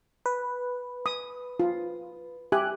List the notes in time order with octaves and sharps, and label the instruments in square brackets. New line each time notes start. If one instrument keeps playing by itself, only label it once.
[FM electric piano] B4
[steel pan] D#6
F4
[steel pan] G4 [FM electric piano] E5 G#5 F#6